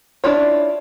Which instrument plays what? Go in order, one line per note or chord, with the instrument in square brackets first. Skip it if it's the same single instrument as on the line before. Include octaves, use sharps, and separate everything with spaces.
[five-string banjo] D4 E4 F4 C#5